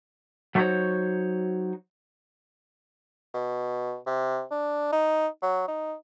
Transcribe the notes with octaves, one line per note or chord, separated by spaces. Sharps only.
F#3 A3 D#4 F#4 C5 C#5
B2
C3
D4
D#4
F#3
D#4